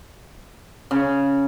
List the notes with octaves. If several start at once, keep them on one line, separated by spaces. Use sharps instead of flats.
C#3